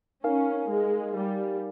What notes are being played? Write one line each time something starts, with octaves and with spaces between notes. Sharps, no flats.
C#4 D#4 A#4 F5 G#5
G#3
G3